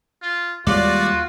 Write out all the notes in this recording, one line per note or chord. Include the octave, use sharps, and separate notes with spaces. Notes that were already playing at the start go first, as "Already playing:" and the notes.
F4
D#2 G3 G#3 F4 F#4 D5